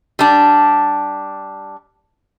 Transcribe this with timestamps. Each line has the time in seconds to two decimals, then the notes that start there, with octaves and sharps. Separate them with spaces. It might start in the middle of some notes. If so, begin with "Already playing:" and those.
0.19 G3 D4